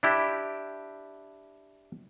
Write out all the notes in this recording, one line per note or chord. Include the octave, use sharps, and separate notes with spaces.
D4 E4 G4